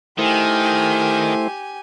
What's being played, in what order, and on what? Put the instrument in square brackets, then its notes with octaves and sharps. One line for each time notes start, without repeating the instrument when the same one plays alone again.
[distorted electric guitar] D#3 [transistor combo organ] A3 E4 C5 [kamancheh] G4 G#5